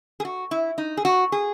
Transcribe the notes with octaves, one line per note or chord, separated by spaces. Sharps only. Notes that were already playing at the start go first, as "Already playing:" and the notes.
G#4
F#4
E4
D#4
G#4
F#4
G#4